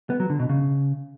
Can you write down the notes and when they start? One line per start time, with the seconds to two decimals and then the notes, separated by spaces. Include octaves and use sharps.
0.10 B3
0.20 F#3
0.30 D3
0.39 B2
0.49 C#3